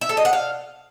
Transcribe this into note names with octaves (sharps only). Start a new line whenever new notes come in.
E5
A4
D#5
F#5
F5